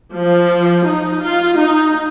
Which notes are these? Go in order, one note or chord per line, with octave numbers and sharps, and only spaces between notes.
F3
D#4
F4
D#4